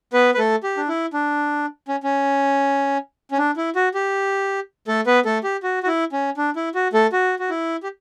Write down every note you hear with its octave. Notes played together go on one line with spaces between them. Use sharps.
B3 B4
B4
A3 A4
G4
D4
E4
D4
C#4
C#4
C#4
D4
E4
F#4
G4
A3 A4
B3 B4
A3 A4
G4
F#4
F#4
E4
C#4
D4
E4
F#4
A3 A4
F#4
F#4
E4
G4